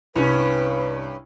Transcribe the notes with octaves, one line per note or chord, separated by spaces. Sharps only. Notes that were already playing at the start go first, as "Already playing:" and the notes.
C2 G2 C#4 B4